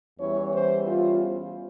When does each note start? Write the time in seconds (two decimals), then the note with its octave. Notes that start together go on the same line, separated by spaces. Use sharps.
0.19 E2 E3 G3 C#4 C#5
0.53 C5
0.87 F4